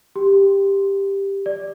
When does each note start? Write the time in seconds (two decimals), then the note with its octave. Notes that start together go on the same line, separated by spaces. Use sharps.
0.16 G4
1.46 D5